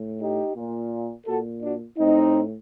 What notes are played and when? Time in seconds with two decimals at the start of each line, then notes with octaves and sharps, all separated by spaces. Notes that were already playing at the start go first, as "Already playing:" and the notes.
Already playing: A2
0.20 D#4 G4
0.55 A#2
1.27 A#2 F#4 A4
1.62 D4 F#4
1.98 A2 C4 D#4